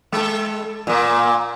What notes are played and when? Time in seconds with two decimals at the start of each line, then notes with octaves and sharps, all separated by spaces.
0.12 G#3 A4
0.87 A#2 A#3